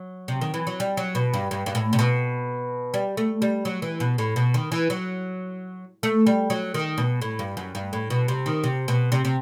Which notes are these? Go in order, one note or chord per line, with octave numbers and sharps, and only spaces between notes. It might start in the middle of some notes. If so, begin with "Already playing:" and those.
Already playing: F#3
C3
D#3
E3
F#3
G3
F#3
B2
G2
G2
G2
A2
C3
B2
G3
A3
G3
F#3
E3
B2
A2
B2
D#3
E3
F#3
A3
G3
F#3
D#3
B2
A2
G2
F#2
G2
A2
B2
C3
D#3
C3
B2
C3
C3